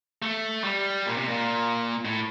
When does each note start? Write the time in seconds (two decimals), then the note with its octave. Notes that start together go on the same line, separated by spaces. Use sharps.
0.22 A3
0.64 G3
1.06 A#2
1.17 C3
1.28 A#2
2.05 A2